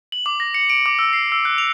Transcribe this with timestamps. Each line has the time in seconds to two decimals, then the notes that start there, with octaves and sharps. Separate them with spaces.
0.12 F#7
0.26 D6
0.40 A#6
0.54 C#7
0.70 D7
0.86 D6
0.99 E6
1.13 C7
1.32 E6
1.45 F#6
1.58 F7